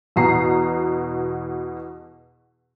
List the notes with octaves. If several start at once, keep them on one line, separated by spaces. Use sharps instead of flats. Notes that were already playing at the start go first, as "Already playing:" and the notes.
E2 B2 A#5 C7